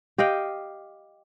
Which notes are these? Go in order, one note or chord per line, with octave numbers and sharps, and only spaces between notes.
G4 D#5 F5 G5